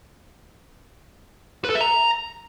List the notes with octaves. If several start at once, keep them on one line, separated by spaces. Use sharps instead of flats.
B4
A4
E5
A#5